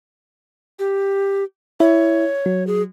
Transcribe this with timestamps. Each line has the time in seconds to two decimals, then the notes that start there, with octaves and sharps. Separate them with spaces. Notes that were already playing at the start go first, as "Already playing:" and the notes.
0.79 G4
1.80 E4 C#5
2.46 F#3
2.67 G#4